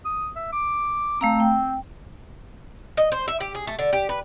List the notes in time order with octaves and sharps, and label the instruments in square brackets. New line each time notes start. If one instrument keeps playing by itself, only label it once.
[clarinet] D#6
E5
D6
[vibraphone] A3 F5 A#5 [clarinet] C4
[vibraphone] G5
[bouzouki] D#5
C5
E5
G4
G#4
A3
D3
G4
B4